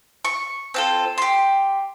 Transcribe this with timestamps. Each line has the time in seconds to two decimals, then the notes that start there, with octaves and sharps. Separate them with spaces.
0.25 C#6
0.74 C4 F4 A4
1.18 G4 C6